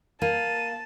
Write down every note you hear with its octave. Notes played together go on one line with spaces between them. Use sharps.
A#3 A5 D#7